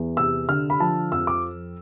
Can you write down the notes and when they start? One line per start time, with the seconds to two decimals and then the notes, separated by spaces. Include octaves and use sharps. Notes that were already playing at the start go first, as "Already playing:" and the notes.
Already playing: E2
0.17 C3 E6
0.49 D3 F6
0.70 B5
0.80 F3 A5
1.12 F2 E6
1.27 D6